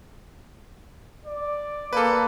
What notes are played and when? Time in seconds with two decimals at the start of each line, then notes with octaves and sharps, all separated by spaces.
1.25 D5
1.93 A#3 A4 B4